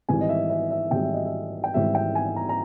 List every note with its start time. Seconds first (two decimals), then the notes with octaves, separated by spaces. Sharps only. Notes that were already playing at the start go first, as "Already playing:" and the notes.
0.09 G#1 G#2 E3 G3 G#5
0.21 D#5
0.29 E5
0.50 E5
0.71 E5
0.91 G#1 G#2 E3 G3 G5
1.03 E5
1.14 D#5
1.26 E5
1.64 G5
1.74 G#1 G#2 E3 G3 E5
1.95 G5
2.15 G#5
2.36 A#5
2.49 A#5